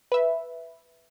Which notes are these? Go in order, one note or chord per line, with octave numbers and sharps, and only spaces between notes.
B4 E5